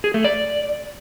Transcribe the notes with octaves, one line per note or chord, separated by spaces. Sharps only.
G#4
A3
D5